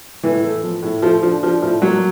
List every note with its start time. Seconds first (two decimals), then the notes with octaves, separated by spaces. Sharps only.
0.23 A2 E3
0.43 A3
0.63 F3
0.82 A2
1.02 F3 A3
1.23 F3 D4
1.43 F3 D4
1.62 A2 F3
1.82 F#3 A#3